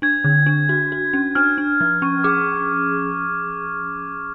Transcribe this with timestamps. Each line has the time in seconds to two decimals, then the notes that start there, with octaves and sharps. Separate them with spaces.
0.02 D4 G#6
0.24 D3
0.46 D4
0.69 F#4
0.92 F#4
1.13 C#4
1.35 D4 F6
1.58 D4
1.81 F3
2.02 C#4 C#6
2.24 G#4 D6